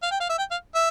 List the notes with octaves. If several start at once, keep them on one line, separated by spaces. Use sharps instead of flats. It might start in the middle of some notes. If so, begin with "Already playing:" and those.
F5
G5
F5
E5
G5
F5
E5